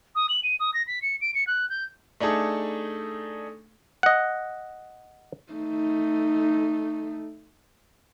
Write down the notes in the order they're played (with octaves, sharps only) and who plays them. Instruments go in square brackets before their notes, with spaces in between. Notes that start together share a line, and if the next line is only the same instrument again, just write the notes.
[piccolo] D#6
F#7
D#7
D#6
A#6
B6
C#7
D7
C#7
F#6
G6
[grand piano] A3 D4 D#4 G#4 A4
[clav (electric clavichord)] D#5 F#5
[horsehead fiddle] A3 D#4